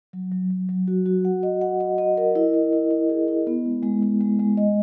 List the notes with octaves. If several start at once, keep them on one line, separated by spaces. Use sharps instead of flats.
F#3
F#3
F#3
F#3
F#4
F#4
F#5
D#5
F#5
D#5
D#5
A#4
E4
E4
E4
E4
G#4
E4
B3
G#3
G#3
G#3
G#3
G#3
D#5